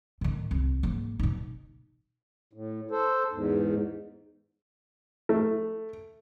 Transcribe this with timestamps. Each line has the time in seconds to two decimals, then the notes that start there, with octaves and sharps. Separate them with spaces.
0.21 A2 D#3
0.51 C2
0.83 G#2 A#3
1.19 B2 D#4
2.53 A2
2.91 A4 C5
3.32 E2 G#2
5.29 A3